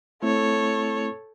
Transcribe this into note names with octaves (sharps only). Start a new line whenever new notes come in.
A3 C4 E4 A4 C#5